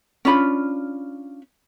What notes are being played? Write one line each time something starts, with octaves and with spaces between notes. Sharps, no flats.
C#4 D4 F4 B5